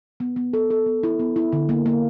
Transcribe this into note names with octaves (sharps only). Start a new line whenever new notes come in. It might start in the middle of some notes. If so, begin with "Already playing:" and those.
B3
B3
A4
A4
B3
E4
B3
E4
D3
A#3
A#3